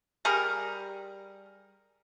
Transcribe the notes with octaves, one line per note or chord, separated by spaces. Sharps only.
G3 G#4 A#4